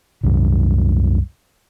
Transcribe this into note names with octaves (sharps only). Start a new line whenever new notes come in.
C2 F#2